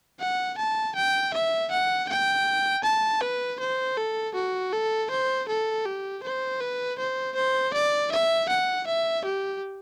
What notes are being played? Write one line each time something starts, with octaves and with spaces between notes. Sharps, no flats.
F#5
A5
G5
E5
F#5
G5
A5
B4
C5
A4
F#4
A4
C5
A4
G4
C5
B4
C5
C5
D5
E5
F#5
E5
G4